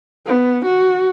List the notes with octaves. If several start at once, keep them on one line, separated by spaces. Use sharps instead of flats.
B3
F#4